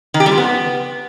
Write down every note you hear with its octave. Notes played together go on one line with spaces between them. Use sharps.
D#3
G4
G3
F3
B3